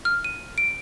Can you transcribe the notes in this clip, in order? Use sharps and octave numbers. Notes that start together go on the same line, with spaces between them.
F6
D#7
D7